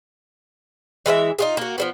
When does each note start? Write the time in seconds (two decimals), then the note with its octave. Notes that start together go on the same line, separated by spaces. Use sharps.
1.06 E3 G#3 B4 E5
1.39 D#4 F4 G#4
1.57 A#3 F#4
1.78 F3 G3 B3